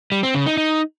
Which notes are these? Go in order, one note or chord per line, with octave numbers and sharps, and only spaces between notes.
G3
C4
C#3
D#4
D#4